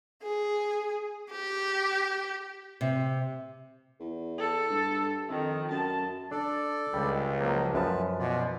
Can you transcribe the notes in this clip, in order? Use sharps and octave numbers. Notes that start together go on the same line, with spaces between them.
G#4
G4
C3
E2
A4
G2
F2 D#3
F#2 A5
D4 A4 D5
C#2 G3
F3 F#3 A#3
F#2 F3 B4 A5
B2 F4 D5